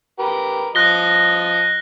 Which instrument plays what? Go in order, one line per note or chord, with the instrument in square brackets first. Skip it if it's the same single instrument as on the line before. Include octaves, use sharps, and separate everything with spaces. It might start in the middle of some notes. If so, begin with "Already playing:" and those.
[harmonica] G4 A#4 B4
[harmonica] F3 D#5 [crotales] F#6 A#6 G7